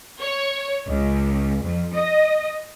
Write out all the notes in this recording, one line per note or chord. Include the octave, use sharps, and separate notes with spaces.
C#5
C#2
F2
D#5